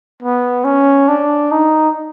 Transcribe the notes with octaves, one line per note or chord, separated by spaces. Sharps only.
B3
C#4
D4
D#4